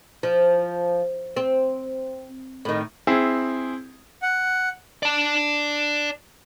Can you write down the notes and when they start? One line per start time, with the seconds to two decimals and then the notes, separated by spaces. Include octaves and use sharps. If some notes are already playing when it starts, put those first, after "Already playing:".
0.23 F3
1.36 C4
2.65 A2 D#3
3.07 C4 E4 G#4
4.22 F#5
5.03 D5 A5